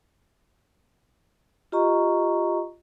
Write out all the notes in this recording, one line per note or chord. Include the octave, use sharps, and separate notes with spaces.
F4 G4 D#5 A#5 C#6